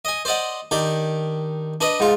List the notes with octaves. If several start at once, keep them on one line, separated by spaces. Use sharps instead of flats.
D#5 G#5
C5 D5 D#5 F#5
D#3 D4 G4
D4 B4 D#5
G#2 F4